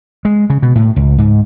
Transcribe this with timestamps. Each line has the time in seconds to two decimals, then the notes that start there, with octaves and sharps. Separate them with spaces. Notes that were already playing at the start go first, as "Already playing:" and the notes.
0.25 G#3
0.50 C#3
0.62 B2
0.75 A2
0.96 C#2
1.18 G#2